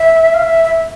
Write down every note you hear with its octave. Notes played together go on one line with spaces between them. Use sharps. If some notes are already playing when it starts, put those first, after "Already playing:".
Already playing: E5
F5
E5
E5